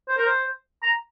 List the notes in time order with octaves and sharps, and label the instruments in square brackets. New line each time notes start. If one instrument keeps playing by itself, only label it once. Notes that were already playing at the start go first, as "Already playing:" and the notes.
[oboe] C5
A#4
C5
A#5